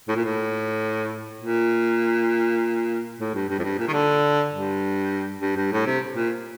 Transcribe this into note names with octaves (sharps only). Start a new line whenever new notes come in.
A2
A#2
A2
A#2
A2
G2
G2
F2
G2
A#2
D#3
D3
G2
G2
G2
A2
C3
A#2